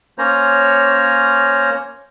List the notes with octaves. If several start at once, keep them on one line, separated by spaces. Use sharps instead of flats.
A#3 C#4 C5 C#5 A#5